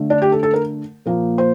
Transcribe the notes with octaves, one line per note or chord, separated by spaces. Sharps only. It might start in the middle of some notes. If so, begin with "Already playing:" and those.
Already playing: D3 A3
D4
G4
A4
A4
A#4
A#2 F3 A#3
C5